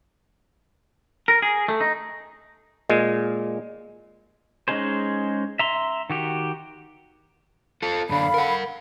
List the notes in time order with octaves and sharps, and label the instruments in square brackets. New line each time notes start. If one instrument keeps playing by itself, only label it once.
[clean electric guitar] A#4
G#4
A3
D#4
[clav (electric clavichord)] A#2 G#3
[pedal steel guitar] G#3 C#4 D#4 G#4 C5
E5 A#5 C6
D#3 F#4 G4
[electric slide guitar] F4 A4
[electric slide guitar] F#2 D3 D4 [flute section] A4 F5 B5
[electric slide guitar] A#4 F#5